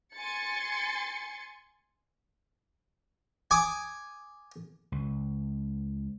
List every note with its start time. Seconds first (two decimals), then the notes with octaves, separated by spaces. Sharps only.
0.15 G#5 C6 A6 C#7
3.51 G#5 D6 D#6
4.92 C#2